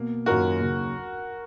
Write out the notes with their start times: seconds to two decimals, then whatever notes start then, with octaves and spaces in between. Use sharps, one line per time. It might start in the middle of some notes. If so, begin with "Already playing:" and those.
Already playing: B2 A#3
0.26 F#2 D#3 A#3 C#4 F4 F#4 A#4
0.60 D#2 C#3 F#3